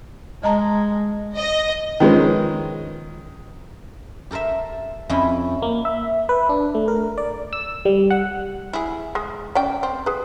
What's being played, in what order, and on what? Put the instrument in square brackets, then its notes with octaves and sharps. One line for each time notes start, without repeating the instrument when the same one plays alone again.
[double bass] G#3 [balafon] D#5 A5 A#5
[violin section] D#5
[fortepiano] D#3 F3 G#3 C#4 B4
[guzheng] G4 A4 A#4 C5 E5
F2 C#4 E4 D#5 G5 B5
[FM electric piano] A#3
E5
B4
D4
A3
A#4
D5
E6
G3
F#5
[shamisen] E4 G#4
G#3
C#4 D5 G5
C4
G#4 B4